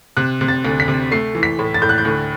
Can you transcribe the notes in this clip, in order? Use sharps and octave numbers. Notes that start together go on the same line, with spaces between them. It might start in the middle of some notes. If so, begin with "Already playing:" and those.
C3 F#6
C3
A6
D2
B6
C3
A3 C7
E3
B6
A2
A6
A2 G6
F#6
G6
D2